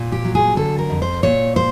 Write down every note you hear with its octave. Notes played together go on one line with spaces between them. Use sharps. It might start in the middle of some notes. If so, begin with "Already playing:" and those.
Already playing: A#2
G4
F#3
G#4
D3 A4
A#4
F2
C5
A#2 C#5
C5